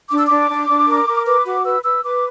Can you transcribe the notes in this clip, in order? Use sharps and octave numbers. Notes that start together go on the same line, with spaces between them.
D4 D6
E6
D4 D6
D4
D4
A#4
A#4
B4 D6
F#4 D6
B4 E6
B4 E6
B4 D6